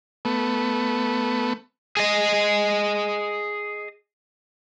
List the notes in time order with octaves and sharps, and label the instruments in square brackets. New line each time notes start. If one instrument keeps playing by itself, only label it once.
[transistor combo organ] A3 B3
[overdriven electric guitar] G#4 D#5